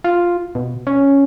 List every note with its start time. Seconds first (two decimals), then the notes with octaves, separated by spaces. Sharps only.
0.04 F4
0.55 B2
0.87 C#4